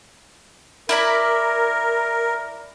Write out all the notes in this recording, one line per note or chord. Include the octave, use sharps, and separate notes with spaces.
E4 A#4 D5 B5